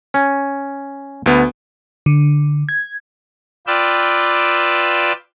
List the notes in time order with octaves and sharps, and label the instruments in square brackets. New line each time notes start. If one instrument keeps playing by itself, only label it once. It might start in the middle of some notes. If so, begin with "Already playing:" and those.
[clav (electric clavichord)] C#4
[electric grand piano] D2 B3
[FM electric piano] D3
G#6
[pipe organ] F4 B4 D5 G5 E6